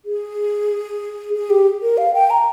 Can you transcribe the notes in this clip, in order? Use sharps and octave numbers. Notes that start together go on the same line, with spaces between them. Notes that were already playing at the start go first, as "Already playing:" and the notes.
G#4
G#4
G4
A#4
F5
G5
A#5